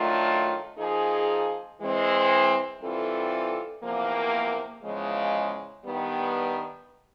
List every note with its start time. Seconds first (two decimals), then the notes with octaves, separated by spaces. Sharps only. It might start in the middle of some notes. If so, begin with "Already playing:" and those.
Already playing: D#3 F#3 A3 D4 F4
0.78 F3 A#3 D#4 G#4
1.80 E3 G#3 C4
2.80 E3 G3 C4 F4 A4
3.82 E2 C3 F3 A#3
4.83 E2 C#3 F3 G#3
5.84 G2 D#3 G3 B3